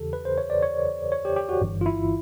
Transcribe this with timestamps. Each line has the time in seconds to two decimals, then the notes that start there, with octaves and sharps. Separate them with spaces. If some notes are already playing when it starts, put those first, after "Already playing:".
Already playing: E2 C#3 E3 G4 A4
0.13 B4
0.25 C5
0.38 C#5
0.50 D5
0.62 C#5
1.12 C#5
1.25 G4
1.36 G4
1.49 F#4
1.61 G1 G2 E3
1.81 F4
1.86 E4